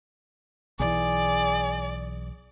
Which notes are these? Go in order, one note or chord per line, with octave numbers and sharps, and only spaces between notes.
B1 E3 G#4 D5